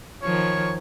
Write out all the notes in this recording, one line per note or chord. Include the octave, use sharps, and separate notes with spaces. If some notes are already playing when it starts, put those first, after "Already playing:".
D#3 F3 C#5